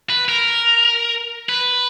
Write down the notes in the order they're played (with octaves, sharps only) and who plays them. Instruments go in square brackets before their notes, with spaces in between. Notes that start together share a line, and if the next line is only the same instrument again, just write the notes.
[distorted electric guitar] B4
A#4
B4